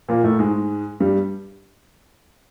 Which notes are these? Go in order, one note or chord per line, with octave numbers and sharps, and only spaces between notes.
A#2 A#3
A2 A3
G#2 G#3
G2 G3